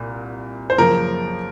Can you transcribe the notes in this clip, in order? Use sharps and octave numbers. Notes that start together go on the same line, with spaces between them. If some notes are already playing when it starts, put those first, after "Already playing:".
Already playing: C2 A#2
C5
F#2 C#3 F3 A#3 A#4